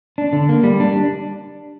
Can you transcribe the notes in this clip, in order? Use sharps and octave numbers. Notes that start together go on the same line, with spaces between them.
D4
D3
A#3
G3
D4